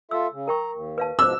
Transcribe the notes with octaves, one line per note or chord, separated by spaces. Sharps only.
F4 A4 E5 E6
C#3
A#4 G5 A#5 C#6
D#2
B4 F5 A5
G#2 B2 F3 C5 D6 E6